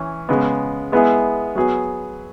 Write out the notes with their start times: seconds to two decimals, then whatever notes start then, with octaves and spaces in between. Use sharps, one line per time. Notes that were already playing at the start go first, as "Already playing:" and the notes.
Already playing: E3 C#4
0.29 C#3 G#3 B3
0.92 G#3 B3 E4 G#4
1.56 F#3 B3 G#4